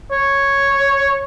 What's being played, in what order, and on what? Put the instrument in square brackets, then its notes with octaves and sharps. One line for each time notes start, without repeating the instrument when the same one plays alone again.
[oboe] C#5